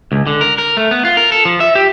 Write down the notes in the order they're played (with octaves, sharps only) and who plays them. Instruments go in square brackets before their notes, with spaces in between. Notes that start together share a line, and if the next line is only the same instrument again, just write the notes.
[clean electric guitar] C#2
D3
A#4
A#4
A3
B3
F4
A#4
A4
F3
E5
G4